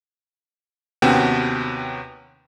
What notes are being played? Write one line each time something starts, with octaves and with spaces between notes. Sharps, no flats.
D#2 C3 B3 C#4 F#4 G5